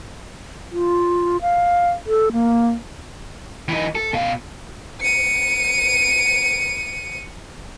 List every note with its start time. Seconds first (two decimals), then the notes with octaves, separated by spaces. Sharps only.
0.72 F4
1.42 F5
2.06 A4
2.32 A#3
3.69 E3 D#4
3.95 A4
4.14 B2 F5
5.01 C#7 D#7